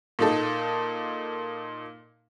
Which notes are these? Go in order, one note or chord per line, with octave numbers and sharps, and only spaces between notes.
A#2 D#4 A4